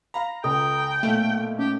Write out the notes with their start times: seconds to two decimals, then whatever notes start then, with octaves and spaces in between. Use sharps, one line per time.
0.14 F5 A#5 B5
0.44 C#2 A4 G5 D#6
1.03 B1 A#2 A3 F5
1.59 C#4 G4